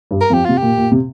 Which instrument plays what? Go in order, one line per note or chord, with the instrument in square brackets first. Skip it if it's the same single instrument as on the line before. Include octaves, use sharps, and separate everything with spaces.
[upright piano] G2 G3
[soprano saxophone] A#4
[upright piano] F2 F3
[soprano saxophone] G4
[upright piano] C3 [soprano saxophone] F4
[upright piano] A#2 [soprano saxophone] G4
[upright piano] A#2
C3